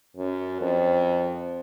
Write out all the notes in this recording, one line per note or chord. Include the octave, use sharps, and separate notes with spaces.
F#2
F2